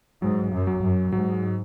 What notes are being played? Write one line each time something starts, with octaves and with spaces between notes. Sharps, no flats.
G#2 F#3
F#2
F#3
F#2
G#2 F#3